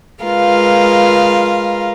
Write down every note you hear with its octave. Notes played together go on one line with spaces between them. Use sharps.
G#3 F4 A#4 B4 F5